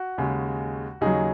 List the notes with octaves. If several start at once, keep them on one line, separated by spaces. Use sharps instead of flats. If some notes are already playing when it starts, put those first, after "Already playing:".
Already playing: F#4
D#2 C#3 G#3
D#2 C#3 F#3 D#4 G#4